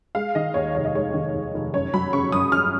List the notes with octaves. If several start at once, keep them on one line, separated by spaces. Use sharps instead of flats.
G#3 F5
D#3 D#5
D#2 C#5
F1 C#5
D#5
G#3 C#5
D#3
D#2
F1
F#2 C#5
F#3 B5
C#3 C#6
F#2 D#6
F#2 F6